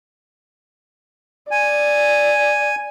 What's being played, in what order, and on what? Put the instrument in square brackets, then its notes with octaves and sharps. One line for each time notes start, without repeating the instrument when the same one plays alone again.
[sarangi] D5 [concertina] G#5